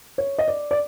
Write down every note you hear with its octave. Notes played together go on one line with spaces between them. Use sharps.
C#5
D#5
D5
D5